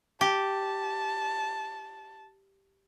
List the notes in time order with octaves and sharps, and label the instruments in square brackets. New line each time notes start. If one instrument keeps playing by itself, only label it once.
[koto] G4 [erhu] A5